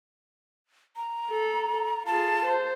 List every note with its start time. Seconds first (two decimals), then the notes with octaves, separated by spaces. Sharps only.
0.96 A#5
1.31 A4
2.06 F4 G#4 A5
2.45 C5